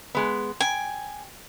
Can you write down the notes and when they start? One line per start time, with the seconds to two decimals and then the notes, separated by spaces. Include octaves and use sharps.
0.15 G#3 B3
0.60 G5 G#5